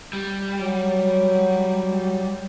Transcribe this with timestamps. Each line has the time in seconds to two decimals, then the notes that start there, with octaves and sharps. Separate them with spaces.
0.13 G3
0.61 F#3